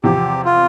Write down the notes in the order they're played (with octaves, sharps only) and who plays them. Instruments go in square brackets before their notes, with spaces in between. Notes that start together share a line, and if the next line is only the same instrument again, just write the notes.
[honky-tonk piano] E2 C3 F3 C4 [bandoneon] G4
[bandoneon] F4